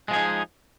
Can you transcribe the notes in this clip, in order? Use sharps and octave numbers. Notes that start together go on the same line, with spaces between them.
F3 G#3 D#4 G#4